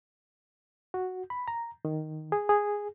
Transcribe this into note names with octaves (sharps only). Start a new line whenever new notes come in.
F#4
B5
A#5
D#3
G#4
G#4